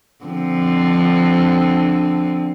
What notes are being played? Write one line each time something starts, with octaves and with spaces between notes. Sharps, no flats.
D3 F3 C4